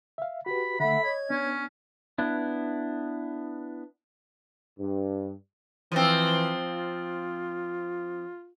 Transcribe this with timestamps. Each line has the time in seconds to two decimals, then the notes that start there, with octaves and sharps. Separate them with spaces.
0.18 E5 F5
0.46 F#4 G4 B4 B5
0.80 D3 A3 A4 E5 F#5 B5
1.04 C#5 D#5 G#6
1.30 B3 C#4 D4
2.18 B3 D4 E4
4.79 G2
5.92 E3 F3 C4
6.67 F4